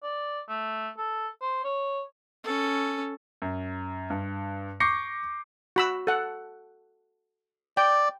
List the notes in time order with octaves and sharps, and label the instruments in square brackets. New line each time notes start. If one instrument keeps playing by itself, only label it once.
[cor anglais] D5
A3
A4
C5
C#5
[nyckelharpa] C#4 A4
[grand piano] F#2
G2
C#6 D6 G6 A#6 C7 C#7
[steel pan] F#4 B5 E6
A4 F#5
[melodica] D5 [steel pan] G5